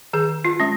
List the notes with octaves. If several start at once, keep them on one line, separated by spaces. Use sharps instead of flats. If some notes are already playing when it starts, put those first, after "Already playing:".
D#3 G#4
F4
G#3 C#4